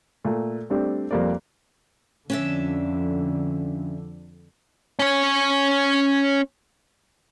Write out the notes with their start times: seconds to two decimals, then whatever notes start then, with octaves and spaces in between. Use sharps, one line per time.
0.24 A#2 A3
0.70 G3 A3 C4 D4 G4
1.11 F2 G3 A#3 C5 D5
2.30 F2 D3 C#4 D4 E5
4.99 C#4 C#5